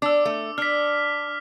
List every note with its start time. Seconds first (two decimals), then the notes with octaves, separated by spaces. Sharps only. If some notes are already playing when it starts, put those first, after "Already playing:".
0.02 D4 D6 E6
0.25 A3
0.58 D4 F6 B6